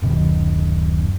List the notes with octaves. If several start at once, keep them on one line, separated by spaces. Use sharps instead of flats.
D1 F#2 B2 D#3